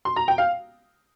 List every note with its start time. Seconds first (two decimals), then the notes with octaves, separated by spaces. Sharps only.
0.05 C6
0.16 A#5
0.28 G5
0.38 F5